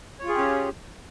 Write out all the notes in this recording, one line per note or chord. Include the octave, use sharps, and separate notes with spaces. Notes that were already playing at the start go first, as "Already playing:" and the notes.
C#4 F4 G4 G#4 C#5